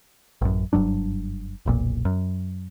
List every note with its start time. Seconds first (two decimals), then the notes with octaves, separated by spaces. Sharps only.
0.42 A1 F#2
0.73 F#1 G2 F#3 D4
1.66 F1 B1 A#2
2.05 F#2